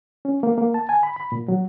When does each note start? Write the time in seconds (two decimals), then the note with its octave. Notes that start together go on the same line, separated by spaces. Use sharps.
0.25 C#4
0.43 A#3
0.58 A#3
0.74 A5
0.89 G#5
1.03 B5
1.16 B5
1.32 A#2
1.48 F#3